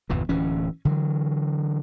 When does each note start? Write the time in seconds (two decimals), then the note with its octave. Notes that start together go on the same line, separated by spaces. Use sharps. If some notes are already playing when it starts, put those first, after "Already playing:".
0.10 G1 E2 A#2 E3
0.29 D1 E3 C#4
0.85 D3 E3 F#3